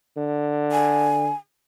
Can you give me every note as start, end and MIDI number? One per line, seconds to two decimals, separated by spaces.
0.16 1.30 50
0.72 1.35 80